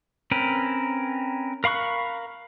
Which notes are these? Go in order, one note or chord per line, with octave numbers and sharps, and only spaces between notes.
C4 C#4 A#4 B4
A#4 F5 B5 C#6 F#6